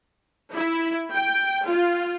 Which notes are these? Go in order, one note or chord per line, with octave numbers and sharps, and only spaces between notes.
E4
G5
F4